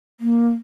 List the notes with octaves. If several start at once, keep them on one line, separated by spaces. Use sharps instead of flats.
A#3